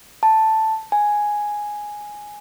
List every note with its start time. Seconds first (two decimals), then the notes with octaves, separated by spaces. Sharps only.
0.23 A5
0.92 G#5